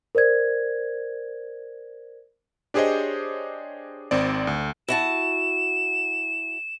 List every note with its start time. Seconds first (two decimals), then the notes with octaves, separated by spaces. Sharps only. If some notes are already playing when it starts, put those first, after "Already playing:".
0.15 A#4 C5 D5 G#6
2.74 D4 G4 G#4 C5 C#5 D#5
4.11 G#1 C4 D5
4.47 D2
4.88 E4 F#4 A5 E7